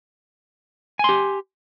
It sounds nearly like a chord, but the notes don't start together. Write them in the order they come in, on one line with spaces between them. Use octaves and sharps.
G#5 C6 G4